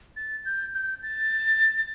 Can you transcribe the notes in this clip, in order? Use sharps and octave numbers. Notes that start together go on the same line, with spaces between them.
A6
G6
G6
A6